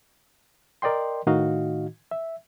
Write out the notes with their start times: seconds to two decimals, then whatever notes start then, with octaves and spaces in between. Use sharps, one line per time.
0.82 A#4 D5 D#5 G5 C6
1.27 A2 D#3 D#4 F#4 D#5 F5
2.11 E5